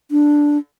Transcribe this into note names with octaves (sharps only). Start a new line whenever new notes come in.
D4